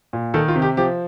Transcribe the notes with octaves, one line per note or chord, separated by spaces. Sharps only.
A#2
D#3 A4
F4
C3
G4
F3 G4